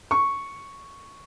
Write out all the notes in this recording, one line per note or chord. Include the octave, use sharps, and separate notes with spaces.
C#6